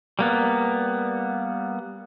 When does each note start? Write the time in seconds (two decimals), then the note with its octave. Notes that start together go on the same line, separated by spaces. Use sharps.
0.19 G3 A#3 B3